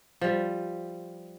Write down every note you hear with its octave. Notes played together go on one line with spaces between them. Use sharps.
F3 G3